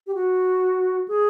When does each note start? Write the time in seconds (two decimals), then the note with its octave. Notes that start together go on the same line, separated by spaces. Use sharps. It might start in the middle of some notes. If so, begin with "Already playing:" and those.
0.07 G4
0.15 F#4
1.08 G#4